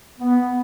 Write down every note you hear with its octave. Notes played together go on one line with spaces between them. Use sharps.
B3